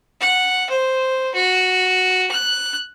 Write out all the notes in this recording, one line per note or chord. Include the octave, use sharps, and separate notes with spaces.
F#5
C5
F#4
F#6